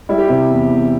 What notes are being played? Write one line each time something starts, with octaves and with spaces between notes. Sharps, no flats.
G3 E4
G4
C3 E4
E2
E2